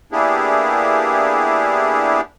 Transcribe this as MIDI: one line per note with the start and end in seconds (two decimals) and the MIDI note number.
0.12 2.21 58
0.12 2.21 59
0.12 2.21 62
0.12 2.21 64
0.12 2.21 67
0.12 2.21 68